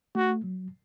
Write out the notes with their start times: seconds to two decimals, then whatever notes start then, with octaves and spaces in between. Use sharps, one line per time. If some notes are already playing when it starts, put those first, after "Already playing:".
0.15 A3 F#4
0.43 F#3